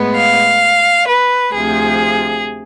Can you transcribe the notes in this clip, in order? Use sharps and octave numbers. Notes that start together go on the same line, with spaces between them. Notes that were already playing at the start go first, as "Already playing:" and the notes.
Already playing: A2 G#3 B3
F5
B4
D2 C3 F3 G#4